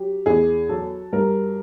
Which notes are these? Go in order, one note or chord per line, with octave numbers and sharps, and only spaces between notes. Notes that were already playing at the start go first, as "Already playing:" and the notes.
Already playing: F#3 G4
E2 G#4
F#3 A4
G2 A#4